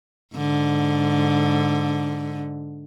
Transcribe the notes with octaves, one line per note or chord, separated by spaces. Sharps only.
G#2 D3